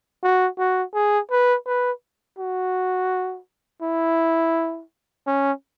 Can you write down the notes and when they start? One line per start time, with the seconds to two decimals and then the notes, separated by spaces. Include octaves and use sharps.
0.23 F#4
0.58 F#4
0.94 G#4
1.31 B4
1.67 B4
2.39 F#4
3.82 E4
5.27 C#4